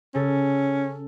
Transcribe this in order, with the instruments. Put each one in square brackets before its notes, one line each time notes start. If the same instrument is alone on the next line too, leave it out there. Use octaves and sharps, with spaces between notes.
[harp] C#3 A4 [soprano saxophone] C#4